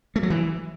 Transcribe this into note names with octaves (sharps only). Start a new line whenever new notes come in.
A3
F#3
E3